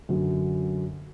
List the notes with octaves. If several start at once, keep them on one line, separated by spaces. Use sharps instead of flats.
F#2 D3 F#3